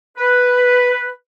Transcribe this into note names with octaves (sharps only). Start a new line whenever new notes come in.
B4